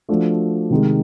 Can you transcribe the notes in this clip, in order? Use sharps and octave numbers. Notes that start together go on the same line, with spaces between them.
F3 A3 D4 F#4
C3 D#3 G#3